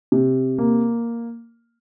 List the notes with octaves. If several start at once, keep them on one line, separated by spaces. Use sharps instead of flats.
C3
A#3